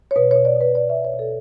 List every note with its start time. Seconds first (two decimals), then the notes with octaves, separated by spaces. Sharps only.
0.11 C#5
0.16 B2 B4
0.31 B2 C#5
0.45 D5
0.55 B2
0.60 B4
0.75 B2 D5
0.89 E5
0.95 B2
1.05 C#5
1.14 B2
1.19 A4